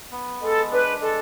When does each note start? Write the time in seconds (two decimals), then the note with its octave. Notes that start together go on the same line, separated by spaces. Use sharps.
0.12 B3
0.41 G#3 A4
0.71 D4 B4
1.01 G#3 A4